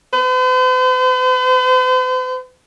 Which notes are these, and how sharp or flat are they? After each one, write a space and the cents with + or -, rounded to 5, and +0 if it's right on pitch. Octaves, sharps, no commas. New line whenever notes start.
C5 -45